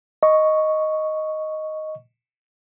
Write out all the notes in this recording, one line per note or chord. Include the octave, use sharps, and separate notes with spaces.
D#5 C#6